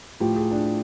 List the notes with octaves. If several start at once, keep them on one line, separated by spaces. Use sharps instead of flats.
A2 F3 G4
G#4
D4